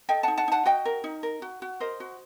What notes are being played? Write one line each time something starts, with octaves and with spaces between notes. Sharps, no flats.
A4 D#5 G5
D#4 F#5 A5
F#5 A5
D#4 F#5 A5
F#4 D#5 G5
A#4
D#4
A#4
F#4
F#4
A#4 C5 D#5
F#4